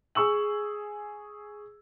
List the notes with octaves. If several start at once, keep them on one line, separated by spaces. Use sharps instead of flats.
G#4 C#6 E6 F#7